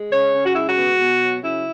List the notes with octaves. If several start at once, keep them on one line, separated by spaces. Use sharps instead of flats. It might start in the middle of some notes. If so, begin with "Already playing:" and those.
Already playing: G#3
C#3 C#5
C#3
F#4
G#3 E4
F#4
B2
B2
F#3
C#3 E4